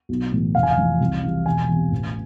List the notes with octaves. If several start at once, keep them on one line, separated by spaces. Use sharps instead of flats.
B1
A2 E3
F1 F5
G#5
F5
F2 E3
C2
C3 E3
E1 G#5
E2 C3
A1